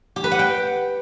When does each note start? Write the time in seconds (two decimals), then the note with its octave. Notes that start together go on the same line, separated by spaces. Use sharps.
0.16 G4
0.24 B4
0.31 F#5
0.39 G5